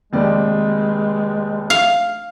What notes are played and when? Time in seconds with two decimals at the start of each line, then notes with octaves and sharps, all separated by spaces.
0.13 F1 D#2 G#3 D5
1.70 F5